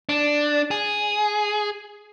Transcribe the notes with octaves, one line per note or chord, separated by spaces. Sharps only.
D4
G#4